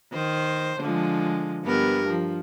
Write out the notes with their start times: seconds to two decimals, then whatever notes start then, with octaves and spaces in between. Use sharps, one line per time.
0.12 D#3 C5
0.80 D3 F3 G#3
1.64 G2 B3 A#4
2.07 F3